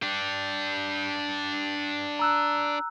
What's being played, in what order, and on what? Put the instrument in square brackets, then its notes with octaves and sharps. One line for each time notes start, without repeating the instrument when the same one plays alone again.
[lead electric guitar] D4 G4
[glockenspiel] A#5 E6 F#6